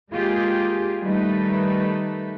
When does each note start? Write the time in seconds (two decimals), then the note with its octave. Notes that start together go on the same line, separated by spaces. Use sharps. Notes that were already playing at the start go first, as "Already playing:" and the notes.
0.12 G#3 A#3 F4 G4 G#4
1.02 D#3 G3 A3 D#4 B4